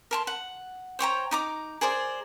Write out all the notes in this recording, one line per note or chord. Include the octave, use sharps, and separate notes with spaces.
A#4 A5 C6
F#5
C5 C#5 G5 A#5
D#4 A#5 D6
G#4 A#4 C5 D5